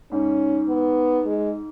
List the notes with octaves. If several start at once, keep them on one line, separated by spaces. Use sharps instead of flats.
G#2 C#4
B3
G#3